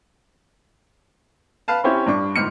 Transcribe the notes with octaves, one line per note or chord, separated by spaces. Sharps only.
B4 F5 A5
C4 C#4 E4 G4 C5 C#5
G2 D4 C#6
G1 G#2 F6 C#7